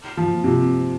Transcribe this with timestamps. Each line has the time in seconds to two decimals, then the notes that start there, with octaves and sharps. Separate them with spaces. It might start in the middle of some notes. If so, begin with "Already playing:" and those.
0.17 F3
0.44 C3